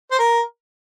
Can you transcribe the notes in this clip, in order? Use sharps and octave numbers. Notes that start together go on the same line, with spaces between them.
C5
A#4